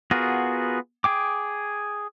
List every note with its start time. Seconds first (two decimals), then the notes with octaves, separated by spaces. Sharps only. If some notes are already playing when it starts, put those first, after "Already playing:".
0.11 B3 F4 F#4 G#4 A#4
1.04 G#4 G5 D6